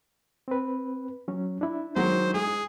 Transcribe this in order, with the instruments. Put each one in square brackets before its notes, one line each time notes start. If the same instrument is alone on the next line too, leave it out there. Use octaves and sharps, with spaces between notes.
[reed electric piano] C4 B4
F#3 C#4
D4 E4
[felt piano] D#3 F#3 G#3 [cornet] C5
[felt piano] G#3 [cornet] G#4